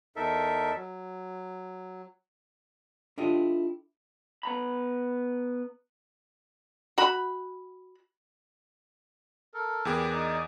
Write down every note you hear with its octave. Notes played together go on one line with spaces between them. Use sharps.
E2 D#4 A4 A#4 E5
F#3
D4 E4 F4 G4 A4 D#5
B3 A#5 B5
F#4 B5
A4 A#4
E2 G4 G#4 A#4 B4 G5
D#4 D5 D#6